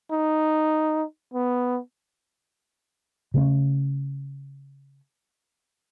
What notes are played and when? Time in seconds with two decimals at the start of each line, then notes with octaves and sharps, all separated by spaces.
0.11 D#4
1.34 B3
3.34 C#3 A3 C#4